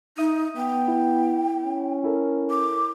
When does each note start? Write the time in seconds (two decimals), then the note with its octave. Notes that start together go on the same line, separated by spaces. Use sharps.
0.18 D#4 E5 D#6 D#7
0.57 B3 G5
0.88 E4
1.65 C#4
2.04 E4 A4 A#4
2.50 D6